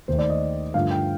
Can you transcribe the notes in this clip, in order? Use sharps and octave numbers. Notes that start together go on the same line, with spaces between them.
D#2 D#3 A3 C5
D5
D#5
G2 D3 F3 A3 F5
G5